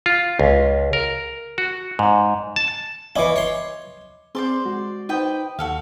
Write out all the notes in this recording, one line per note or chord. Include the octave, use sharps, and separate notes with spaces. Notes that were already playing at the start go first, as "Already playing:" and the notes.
F4
C#2
A#4
F#4
G#2
A5
E3 C#4 D#5 D6
C#5 C6
C4 G#4 C5 D5 C6
G#3 F#4
D#4 B4 C5 D#5 G5
D#2 F#4 A4 F5